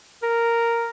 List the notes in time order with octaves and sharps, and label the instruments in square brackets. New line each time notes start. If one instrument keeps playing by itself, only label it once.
[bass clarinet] A#4